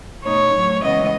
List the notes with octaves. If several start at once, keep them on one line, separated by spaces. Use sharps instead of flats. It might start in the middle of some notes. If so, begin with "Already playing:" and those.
B2 A3 D#4 C#5
A2 F#3 A3
C#3 E3 G#3 B3 D#5